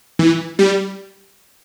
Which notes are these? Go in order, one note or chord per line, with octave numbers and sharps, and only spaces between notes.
E3
G3